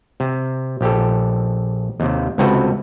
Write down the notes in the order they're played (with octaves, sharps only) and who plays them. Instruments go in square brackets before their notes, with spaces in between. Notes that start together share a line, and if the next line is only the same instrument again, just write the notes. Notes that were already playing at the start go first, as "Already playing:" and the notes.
[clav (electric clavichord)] C3
A#1 G4 A4
D#2 C3
C#2 C3 C4 F#4 A4 B4